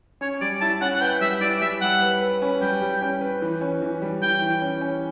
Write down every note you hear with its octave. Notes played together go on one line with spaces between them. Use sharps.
C#4 C#5
G3 D5
E4 A5
C#4 F#5
F#5
B4 G5
G3 E5
E4 D5
G3 E5
G3 F#5
B4
B4
C#4
G3 G5
G3
C#4
B4
E3
C#4
E3
G3
E3 G5
E3
C#4
C#4